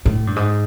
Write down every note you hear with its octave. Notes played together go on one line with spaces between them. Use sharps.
A2
G2
G#2